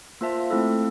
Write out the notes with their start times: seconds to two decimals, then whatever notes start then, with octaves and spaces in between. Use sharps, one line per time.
0.21 A#3 F4 C5 E5 A5
0.50 A3 C4 E4 A4